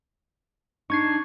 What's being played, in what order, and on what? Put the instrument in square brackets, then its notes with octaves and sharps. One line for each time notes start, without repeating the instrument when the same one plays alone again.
[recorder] D4 [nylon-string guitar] D#4 [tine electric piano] C#6 G#6 C7